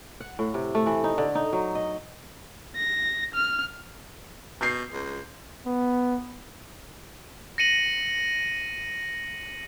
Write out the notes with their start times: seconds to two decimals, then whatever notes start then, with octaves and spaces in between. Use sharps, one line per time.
0.20 F#5
0.39 A2
0.54 C3
0.75 A3
0.86 E3
1.04 D#4
1.18 D3
1.35 D#4
1.53 F#3
1.75 D#5
2.76 A#6
3.34 F6
4.61 B2 G6 C7
4.92 C#2
5.66 B3
7.58 A#6 C#7 D#7 F#7